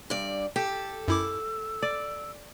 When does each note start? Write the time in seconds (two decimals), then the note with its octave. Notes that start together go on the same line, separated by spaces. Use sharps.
0.10 G2 D5
0.56 G4 A4
1.08 F#2 E4 D6 E6
1.83 D5